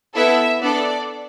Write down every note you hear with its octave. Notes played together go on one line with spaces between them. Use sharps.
B3 E4 A4 E5
B3 D4 A4 D5